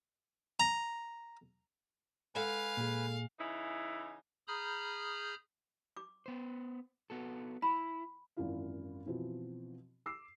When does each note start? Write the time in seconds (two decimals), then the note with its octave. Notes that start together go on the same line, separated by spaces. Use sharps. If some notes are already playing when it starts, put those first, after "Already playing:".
0.60 A#5
2.35 G#3 A4 B4 F5 F#5 G#5
2.77 A#2 G#4
3.39 C#3 E3 D#4 E4
4.48 G#4 A#5 B5 D#6 F6 G6
5.97 D6
6.26 B3 C5
7.10 B3 F#4 A4
7.62 E4 B5
8.37 G#1 F#2 E3 E4 F4 F5
9.06 B2 E3 F3 C4 F#4
10.06 D6 E6 C7